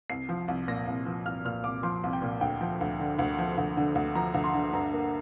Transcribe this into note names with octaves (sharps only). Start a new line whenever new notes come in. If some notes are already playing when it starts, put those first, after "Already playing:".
C2 C7
F3
C2
A#2 A#6
C2
F3
C2 F6
A#2 F6
C2 D6
F3 C6
C2
G5
A#2
D2 G5
F3
D2
D3
D2
F3
D2
D3
D2
F3 A#5
D2
C6
D3
G2 A#5
A#3